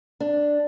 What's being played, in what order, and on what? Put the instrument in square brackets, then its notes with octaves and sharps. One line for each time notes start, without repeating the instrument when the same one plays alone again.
[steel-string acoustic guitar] D4